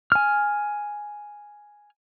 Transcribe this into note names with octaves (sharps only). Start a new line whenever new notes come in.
G#5 F6